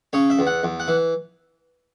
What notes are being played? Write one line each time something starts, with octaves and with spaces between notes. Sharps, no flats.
C#3 C#5
E5
E2
F#5
E2
F#5
E3